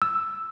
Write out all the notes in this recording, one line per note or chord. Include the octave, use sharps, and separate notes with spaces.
E6